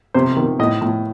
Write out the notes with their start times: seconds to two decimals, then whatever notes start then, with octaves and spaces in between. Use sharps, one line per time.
0.14 C3 C5
0.36 D#3
0.59 A2 D#5
0.82 A2